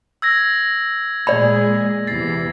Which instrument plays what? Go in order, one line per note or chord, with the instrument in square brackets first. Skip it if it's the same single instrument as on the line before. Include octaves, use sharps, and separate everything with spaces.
[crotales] E6 G#6 A#6
[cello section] A#2 G#3 G#4 [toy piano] D5 B5
[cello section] E2 C3 E3 [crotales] A6 C7